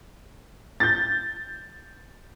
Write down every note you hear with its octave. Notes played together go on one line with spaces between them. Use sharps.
G6 A6